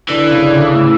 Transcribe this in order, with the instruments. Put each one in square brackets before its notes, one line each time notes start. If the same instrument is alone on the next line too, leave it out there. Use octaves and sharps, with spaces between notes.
[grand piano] D3 [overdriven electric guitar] E3
[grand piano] C#3
D3
C#3
A2